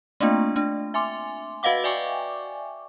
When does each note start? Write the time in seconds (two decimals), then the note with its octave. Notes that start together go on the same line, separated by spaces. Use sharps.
0.20 A3 A#3 C4 D4 F4
0.56 A3 D4
0.94 E5 G#5 C6 D6
1.63 F#4 B4 D#5 F5 F#5 D6
1.84 D5 E5 G5 G#5 C#6 D6